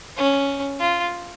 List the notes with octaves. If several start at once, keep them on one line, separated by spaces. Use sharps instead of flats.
C#4
F4